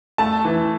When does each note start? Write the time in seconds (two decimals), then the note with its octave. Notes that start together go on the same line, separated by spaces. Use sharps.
0.18 A3 A5
0.45 E3